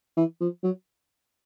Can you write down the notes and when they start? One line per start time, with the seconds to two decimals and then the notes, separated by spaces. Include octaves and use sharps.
0.17 E3
0.41 F3
0.63 F#3